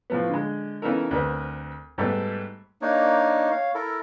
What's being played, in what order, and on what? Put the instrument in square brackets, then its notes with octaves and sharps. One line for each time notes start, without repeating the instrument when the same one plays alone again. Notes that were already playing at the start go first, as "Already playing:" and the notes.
[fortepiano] A2 F3 B3
D3 G#3
C#3 E3 B3 D#4 A4 A#4
D2 C4 A#4 B4
G#2 G3 A3 B3
[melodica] A#3 D4 D#4 C#5
C#5 F5
E4 A4 A#4